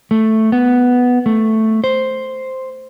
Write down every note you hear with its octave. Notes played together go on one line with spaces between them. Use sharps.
A3
B3
A3
C5